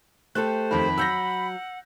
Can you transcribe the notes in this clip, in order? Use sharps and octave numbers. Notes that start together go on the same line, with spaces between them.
A3 G4 A4 C5 F#6
F2 D#3 B5
F#3 F#5 E6 G6 A#6